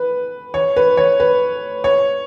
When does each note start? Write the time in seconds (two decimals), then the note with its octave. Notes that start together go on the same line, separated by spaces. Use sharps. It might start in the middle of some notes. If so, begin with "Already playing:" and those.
Already playing: B4
0.54 C#5
0.76 B4
0.97 C#5
1.20 B4
1.84 C#5